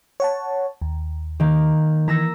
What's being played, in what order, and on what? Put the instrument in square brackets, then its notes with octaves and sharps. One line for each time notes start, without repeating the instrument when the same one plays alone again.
[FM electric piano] C#5 F#5 A5
D#2
[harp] D#3 A#3
[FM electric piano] E3 [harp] A#5 E6 A#6